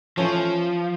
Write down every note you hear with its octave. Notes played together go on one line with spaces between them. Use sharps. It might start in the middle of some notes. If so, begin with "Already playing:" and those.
E3 F3 A3 C#4